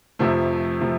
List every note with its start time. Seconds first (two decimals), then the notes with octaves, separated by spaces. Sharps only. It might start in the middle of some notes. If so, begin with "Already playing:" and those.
0.19 F1 F2 C3 F3 A3
0.81 C3 F3 A3